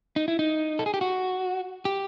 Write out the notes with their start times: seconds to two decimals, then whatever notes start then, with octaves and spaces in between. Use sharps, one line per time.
0.16 D#4
0.28 E4
0.39 D#4
0.79 A4
0.86 G#4
0.94 G4
1.01 F#4
1.85 G4